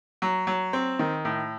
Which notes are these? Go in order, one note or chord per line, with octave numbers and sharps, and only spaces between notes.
F#3
F#3
C4
D#3
A2